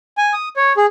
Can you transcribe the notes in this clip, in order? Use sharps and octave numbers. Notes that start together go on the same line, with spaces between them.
G#5
D#6
C#5
G#4